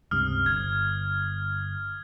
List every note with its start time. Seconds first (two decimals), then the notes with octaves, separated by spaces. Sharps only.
0.11 C#2 G2 C3 D#6 F6
0.46 G1 G#6